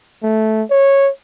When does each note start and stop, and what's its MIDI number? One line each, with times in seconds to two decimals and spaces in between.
0.23 0.63 57
0.71 1.10 73